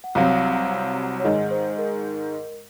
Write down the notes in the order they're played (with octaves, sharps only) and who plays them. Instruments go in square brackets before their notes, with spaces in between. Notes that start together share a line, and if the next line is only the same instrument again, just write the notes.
[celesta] F#5
[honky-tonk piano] C2 C3 F#3 C4 [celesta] F5
[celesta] C#5
[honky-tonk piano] G#2 D#3 G#3 [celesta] D#5
[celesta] C5
A#4